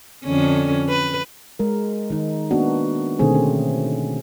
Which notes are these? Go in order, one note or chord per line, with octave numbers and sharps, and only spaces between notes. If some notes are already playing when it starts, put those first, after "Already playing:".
F2 D3 C#4
B4
G#3 A#4
D#3 D#4
A#3 B3 C#4 D4 F#4
B2 D3 D#3 A3 C4 G#4
C#4